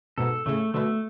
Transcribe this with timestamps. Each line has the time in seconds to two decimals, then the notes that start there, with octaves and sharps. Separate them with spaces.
0.18 G#2 B2 A4
0.46 A2 C#3 A3
0.74 B2 D3 A3